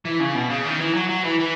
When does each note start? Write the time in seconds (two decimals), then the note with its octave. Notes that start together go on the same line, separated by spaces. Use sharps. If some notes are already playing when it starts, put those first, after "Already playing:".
0.05 E3
0.20 C#3
0.35 B2
0.49 C#3
0.65 D#3
0.79 E3
0.94 F#3
1.09 F#3
1.24 E3
1.39 E3